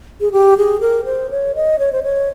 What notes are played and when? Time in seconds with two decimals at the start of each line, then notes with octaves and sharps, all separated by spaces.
0.21 G#4
0.32 G4
0.57 G#4
0.81 A#4
1.05 C5
1.31 C#5
1.55 D#5
1.79 C#5
1.93 C5
2.03 C#5